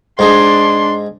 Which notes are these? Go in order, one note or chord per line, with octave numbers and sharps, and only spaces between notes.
G#2 D4 D#4 G#4 C6